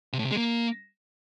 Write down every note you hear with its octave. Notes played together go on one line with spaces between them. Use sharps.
C3
A2
C3
G#3
A#3